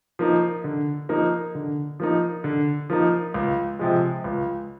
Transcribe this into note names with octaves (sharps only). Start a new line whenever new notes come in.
F3 A#3 D#4
D3
F3 A#3 D#4
D3
F3 A#3 D#4
D3
F3 A#3 D#4
C#2
C3 F3 G#3
C#2